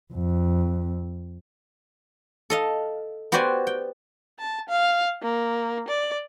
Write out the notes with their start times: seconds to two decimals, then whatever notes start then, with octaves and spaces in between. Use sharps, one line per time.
0.13 F2
2.50 A4 D#5 F5
3.32 B3 F#4 G4 C5 D5 G#5
3.67 G5
4.39 A5
4.69 F5
5.22 A#3
5.88 D5